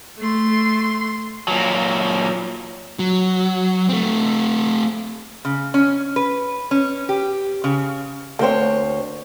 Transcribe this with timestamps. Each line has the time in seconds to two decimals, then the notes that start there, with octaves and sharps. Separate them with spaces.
0.18 A3 C6
1.48 A#2 F#3
2.99 F#3
3.89 A3 C4
5.45 C#3
5.74 C#4
6.16 B4
6.71 C#4
7.09 G4
7.64 C#3
8.39 D2 A#3 C4 C5 C#5